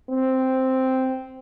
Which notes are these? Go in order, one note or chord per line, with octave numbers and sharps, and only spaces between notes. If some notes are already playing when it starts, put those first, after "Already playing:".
C4